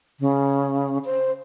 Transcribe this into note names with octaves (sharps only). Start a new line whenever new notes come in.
C#3
C5